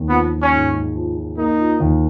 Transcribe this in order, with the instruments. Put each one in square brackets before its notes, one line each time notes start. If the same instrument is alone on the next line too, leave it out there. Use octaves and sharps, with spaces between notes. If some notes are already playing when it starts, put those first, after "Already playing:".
Already playing: [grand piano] D#2
[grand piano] F3 [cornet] B3
[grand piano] F3
[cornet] C#4
[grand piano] G#2
G#3
F3
F3
[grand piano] A#3 [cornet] D#4
[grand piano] F4
D#2